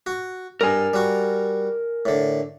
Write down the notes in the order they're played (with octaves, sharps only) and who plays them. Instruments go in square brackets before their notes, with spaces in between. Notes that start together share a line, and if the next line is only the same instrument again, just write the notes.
[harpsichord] F#4
[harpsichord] G2 [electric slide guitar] A#4 G#5
[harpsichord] G3 F#4
A2 D3